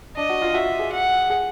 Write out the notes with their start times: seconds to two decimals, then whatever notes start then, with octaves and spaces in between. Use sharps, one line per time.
0.16 D4 D#5
0.30 F#4
0.42 F4
0.54 F#4 E5
0.79 G#4
0.93 F#5
1.30 G#4